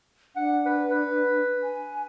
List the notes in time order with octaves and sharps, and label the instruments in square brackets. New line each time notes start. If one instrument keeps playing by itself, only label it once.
[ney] D4 [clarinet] F#5
[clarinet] B4
B4
[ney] G#5